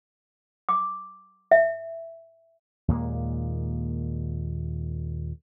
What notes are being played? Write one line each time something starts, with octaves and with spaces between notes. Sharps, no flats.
D6
E5
D#2 A#2 G#3 A#3